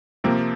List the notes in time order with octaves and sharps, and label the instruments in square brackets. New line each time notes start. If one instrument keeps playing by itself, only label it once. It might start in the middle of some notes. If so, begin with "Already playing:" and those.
[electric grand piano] C3 F3 C4 [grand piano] A#3